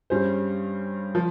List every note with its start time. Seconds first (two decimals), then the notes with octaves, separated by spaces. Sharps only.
0.10 G2 G3 C#4 G#4 C5
1.15 F3